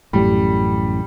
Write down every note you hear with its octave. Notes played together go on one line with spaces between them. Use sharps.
A1 F#2 A2 G3